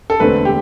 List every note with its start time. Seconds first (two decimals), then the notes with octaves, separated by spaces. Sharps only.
0.10 A4
0.20 E1 D2 D3 A3 C4 B4
0.45 G4